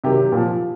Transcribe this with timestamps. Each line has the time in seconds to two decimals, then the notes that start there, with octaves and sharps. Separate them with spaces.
0.04 C3 D#3 F#3 G4
0.32 A#2
0.37 F3